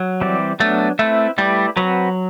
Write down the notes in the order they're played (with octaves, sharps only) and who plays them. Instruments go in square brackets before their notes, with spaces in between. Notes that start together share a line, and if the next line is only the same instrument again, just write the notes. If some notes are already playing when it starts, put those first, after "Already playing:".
Already playing: [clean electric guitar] F#3
[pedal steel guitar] E3 G3 C4 G4 D5
[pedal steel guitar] F#3 B3 D4 [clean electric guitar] A3
[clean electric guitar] A3 [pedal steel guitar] C4 E4 B4 E5
[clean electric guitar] G3 [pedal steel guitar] A3 E4 G4 B4 D5
[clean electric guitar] F#3 [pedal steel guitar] C4 F#4 B4